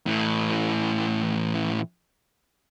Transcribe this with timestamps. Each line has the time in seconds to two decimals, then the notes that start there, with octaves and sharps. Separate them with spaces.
0.06 A2 E3